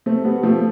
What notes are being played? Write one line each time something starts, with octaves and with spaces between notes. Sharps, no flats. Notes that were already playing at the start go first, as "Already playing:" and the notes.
A3 C4
G3 B3
F3 A3